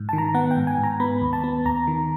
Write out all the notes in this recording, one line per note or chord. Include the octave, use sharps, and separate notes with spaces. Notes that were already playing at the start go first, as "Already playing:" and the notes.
Already playing: G#2
D#3 A5
A#5
B3 F#5
G5
G#2
G#5
G#2
A#5
B3 B5
D#2
A5
B3
D#2 A#5
D#3